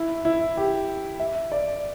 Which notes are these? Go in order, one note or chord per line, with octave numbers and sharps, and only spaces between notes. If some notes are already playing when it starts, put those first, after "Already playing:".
Already playing: E4
E4
G4
E5
D5